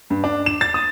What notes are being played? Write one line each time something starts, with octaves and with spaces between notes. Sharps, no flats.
G2
D4
E7
A6
D#6